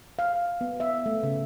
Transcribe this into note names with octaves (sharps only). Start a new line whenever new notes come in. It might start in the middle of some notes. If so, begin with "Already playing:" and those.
F5
B3
E5
A3
C#3